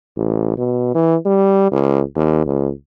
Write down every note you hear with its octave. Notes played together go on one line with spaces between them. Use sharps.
A1
B2
E3
G3
C#2
D#2
C#2